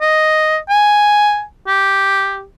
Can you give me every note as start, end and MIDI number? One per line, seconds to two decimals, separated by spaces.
0.01 0.57 75
0.69 1.43 80
1.67 2.44 67